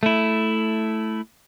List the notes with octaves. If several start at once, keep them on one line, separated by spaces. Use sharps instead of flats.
A3 E4